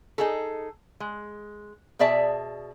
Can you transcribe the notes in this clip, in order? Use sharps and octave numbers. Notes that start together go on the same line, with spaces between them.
D#4 G#4 A4
G#3
B2 G#4 D5 E5 A5